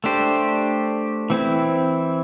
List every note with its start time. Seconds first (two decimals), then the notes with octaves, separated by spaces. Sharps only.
0.04 A3 D4 G4 C5
1.30 E3 C4 E4